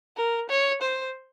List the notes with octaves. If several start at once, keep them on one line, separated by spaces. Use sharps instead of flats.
A#4
C#5
C5